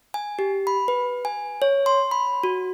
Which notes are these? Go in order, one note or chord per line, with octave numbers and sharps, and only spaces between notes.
G#5
G4
B5
B4
G#5
C#5
C6
B5
F#4